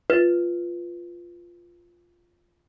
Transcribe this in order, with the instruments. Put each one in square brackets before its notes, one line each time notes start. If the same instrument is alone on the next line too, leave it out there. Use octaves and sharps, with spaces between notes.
[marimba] F4 A6 [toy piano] B4